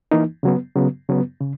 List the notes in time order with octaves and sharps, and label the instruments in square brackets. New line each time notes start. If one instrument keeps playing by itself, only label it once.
[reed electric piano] E3 A#3 D#4
C#3 F#3 B3
C#3 F#3 B3
C#3 F#3 B3
C#3